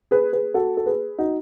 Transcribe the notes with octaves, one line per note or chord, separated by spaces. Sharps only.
G#4 B4
G#4 B4
F#4 A4
A4
G#4 B4
D#4 F#4